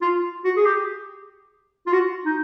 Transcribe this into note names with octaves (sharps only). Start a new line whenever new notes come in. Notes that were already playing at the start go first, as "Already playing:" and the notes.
F4
F#4
G#4
G4
F4
F#4
D#4